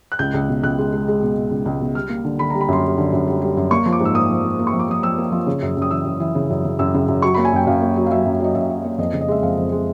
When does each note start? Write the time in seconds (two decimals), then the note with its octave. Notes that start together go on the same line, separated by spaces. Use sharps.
0.12 F#6
0.19 C#2 G6
0.34 C#2
0.49 B2
0.63 C#2 F#6
0.78 G#3
0.92 G#3
1.08 G#3
1.22 B2
1.37 B2
1.51 C#2
1.66 C#2
1.81 B2
1.95 G3 F6
2.09 A#3
2.24 D3
2.39 D3 B5
2.50 G3 A#5
2.61 B5
2.68 F#2 C6
2.83 G3
2.98 D3
3.13 F#2
3.28 G3
3.41 G3
3.57 F#2
3.71 A#3 C#6
3.86 F3
3.93 D6
4.00 G#2 E6
4.15 A#3 D#6
4.30 F3
4.44 A#3
4.59 A#3
4.67 C#6
4.73 F3
4.79 D6
4.88 F3 D#6
5.03 F3 E6
5.18 A#3
5.32 F3
5.47 C#3
5.62 F#2
5.77 F#2
5.82 D#6
5.91 E3 E6
6.05 F#2
6.20 E3
6.35 C#3
6.50 F#2
6.64 C#3
6.79 F#2 E6
6.94 C#3
7.08 F#2
7.22 F#3 C#6
7.34 A#3 B5
7.45 G#5
7.53 F#2 G5
7.67 F#2 F5
7.82 A#3
7.96 F#3
8.07 F5
8.10 F#3 E5
8.26 F#2
8.40 F#3 D#5
8.55 F#2 E5
8.70 F#3
8.84 A#3
8.98 F2 D#5
9.13 C#3
9.21 D#5
9.28 G#3 E5
9.43 F2 F5
9.58 F2
9.72 G#3